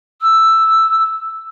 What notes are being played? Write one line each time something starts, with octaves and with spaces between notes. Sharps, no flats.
E6